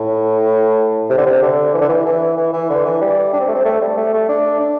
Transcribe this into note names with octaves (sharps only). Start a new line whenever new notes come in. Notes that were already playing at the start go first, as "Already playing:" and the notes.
Already playing: A2
C3
D3
C3
D3
E3
D3
E3
E3
E3
E3
D3
E3
G3
D4
C4
A3
C4
A3
G3
A3
A3
D4
D4